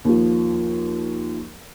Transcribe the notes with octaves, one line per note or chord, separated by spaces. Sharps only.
D#2 F3